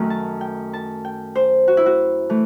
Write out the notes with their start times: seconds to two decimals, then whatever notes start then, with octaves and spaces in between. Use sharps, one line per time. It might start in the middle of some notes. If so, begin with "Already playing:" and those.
Already playing: F#2 D#3 A3 D#4
0.10 A5
0.41 G5
0.73 A5
1.05 G5
1.35 C5
1.68 F#4
1.77 E4
1.86 F#4
2.30 E3 A3